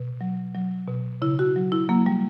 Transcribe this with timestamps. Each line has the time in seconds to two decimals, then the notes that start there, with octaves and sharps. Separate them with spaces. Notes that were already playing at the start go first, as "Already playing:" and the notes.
Already playing: B2
0.21 F#3
0.55 F#3
0.88 B2
1.22 C#3 E4
1.39 F#4
1.56 F#3
1.72 E4
1.89 F#3 A#3
2.06 G3